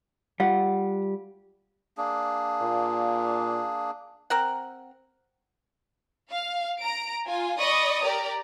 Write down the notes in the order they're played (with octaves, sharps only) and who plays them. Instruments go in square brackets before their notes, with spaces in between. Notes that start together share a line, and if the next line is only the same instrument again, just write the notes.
[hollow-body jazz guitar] G3 F4 [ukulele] F#5
[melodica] A#3 D4 G#4
[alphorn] A#2
[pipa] C4 A#4 F#5
[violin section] F5
A#5 D7
F4 G#5
D5 D#5 B5 C#6 D#6
G4 A#4 D5 A#5